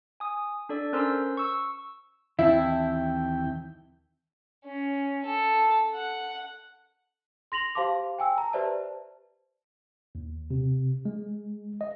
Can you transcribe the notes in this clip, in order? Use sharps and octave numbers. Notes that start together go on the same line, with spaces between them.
G#5 D#6
D4 A4 D5
C#4 A#4 C5 C6 E6
C#6 E6
D#2 D#3 E3 C4 E4 G5 A5
C#4
A4
F#5
C6 A#6 F7 F#7
G4 C5 F5 A5 C6 D6
G5 G#5 E6
A5 A#5
G4 B4 C5 D5 E5 A5
D#2
C3
G#3
D#5